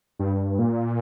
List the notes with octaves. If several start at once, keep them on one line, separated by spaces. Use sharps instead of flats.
G2
A#2